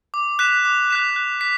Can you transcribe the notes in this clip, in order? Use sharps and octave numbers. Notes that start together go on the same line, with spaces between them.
D6
F#6 B6 E7
D6
F#6 B6 E7
F#6
B6